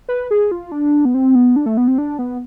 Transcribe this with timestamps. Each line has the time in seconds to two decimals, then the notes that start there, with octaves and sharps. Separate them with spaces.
0.09 B4
0.31 G#4
0.51 F4
0.72 D4
1.05 B3
1.14 C4
1.35 B3
1.56 D4
1.66 A3
1.77 B3
1.88 C4
1.98 D4
2.19 B3